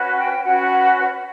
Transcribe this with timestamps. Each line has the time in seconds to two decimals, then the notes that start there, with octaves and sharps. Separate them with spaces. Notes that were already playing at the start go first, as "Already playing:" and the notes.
Already playing: C#4 F#4 B4
0.18 G5
0.43 C#4 F#4 B4 F#5